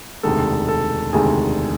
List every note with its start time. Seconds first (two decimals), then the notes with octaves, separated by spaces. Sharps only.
0.23 E1 D2 C3 D#3 G#3 A4
0.68 A4
1.13 E1 D2 C3 D#3 G#3 G#4